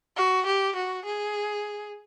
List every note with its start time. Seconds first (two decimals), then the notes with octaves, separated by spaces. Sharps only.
0.17 F#4
0.46 G4
0.76 F#4
1.06 G#4